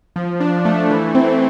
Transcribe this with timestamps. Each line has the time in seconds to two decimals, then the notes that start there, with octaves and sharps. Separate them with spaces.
0.16 F3
0.40 D4
0.65 A3
0.90 E3
1.15 C4